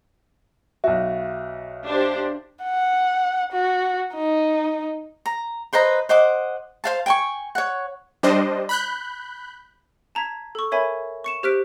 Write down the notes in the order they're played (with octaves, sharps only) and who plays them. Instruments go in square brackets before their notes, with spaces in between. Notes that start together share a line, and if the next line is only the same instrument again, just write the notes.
[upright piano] B1 F#4 [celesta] E5
[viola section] D4 G4 C5
[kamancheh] F#5
F#4
D#4
[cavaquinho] A#5
B4 C5 D#5 A#5
C5 D#5 F#5 D6
C5 F5 A5
G5 G#5 C#6
C#5 F#5
[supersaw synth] G3 D4 C5 D#5
B5 F#6 G6
[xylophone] A5 A#5 G#6 B6
A4 C#6
A#4 C#5 E5 G#5 B5
C#6 C#7 E7
G4 C5 F6 F#6 B6 D7